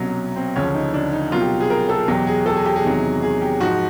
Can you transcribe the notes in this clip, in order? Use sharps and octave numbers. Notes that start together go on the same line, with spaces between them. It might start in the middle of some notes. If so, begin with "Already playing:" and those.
Already playing: C2 B2 F#3 C#4
C4
D2 C#3 F3 C#4
D#4
D4
D#4
C2 B2 F#3 F4
G4
G#4
A#4
A4
E2 B2 F#3 G4
G#4
A4
G#4
G4
G#4
E2 C3 D#3 F#3
G#4
G4
G#2 F3 F#4